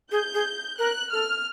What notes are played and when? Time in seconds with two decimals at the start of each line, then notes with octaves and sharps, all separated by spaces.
0.12 G#4 G6
0.34 G#4
0.78 A#4 F#6
1.11 A4 F6